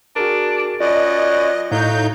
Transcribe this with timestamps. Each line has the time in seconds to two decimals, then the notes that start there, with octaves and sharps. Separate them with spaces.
0.16 D4 F#4 G#4 A#4
0.80 F#2 F4 D5 D#5
1.72 A2 F#3 D#4 E4 A4 F5 G6